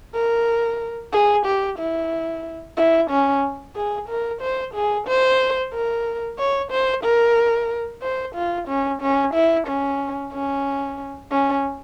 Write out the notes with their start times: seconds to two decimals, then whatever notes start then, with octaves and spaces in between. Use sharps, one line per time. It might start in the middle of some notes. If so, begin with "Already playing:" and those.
0.15 A#4
1.13 G#4
1.46 G4
1.79 E4
2.77 E4
3.10 C#4
3.76 G#4
4.09 A#4
4.42 C5
4.74 G#4
5.08 C5
5.73 A#4
6.39 C#5
6.71 C5
7.04 A#4
8.02 C5
8.35 F4
8.68 C#4
9.02 C#4
9.34 E4
9.67 C#4
10.33 C#4
11.31 C#4